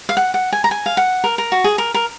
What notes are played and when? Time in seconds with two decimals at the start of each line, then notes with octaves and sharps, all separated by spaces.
0.09 F5
0.17 F#5
0.34 F#5
0.53 G#5
0.64 A#5
0.71 G#5
0.86 F5
0.97 F#5
1.24 A#4
1.38 A#4
1.52 F#4
1.64 G#4
1.78 A#4
1.94 A#4